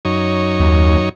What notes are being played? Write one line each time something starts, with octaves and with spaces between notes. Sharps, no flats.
F#2 D#4 C#5
D#2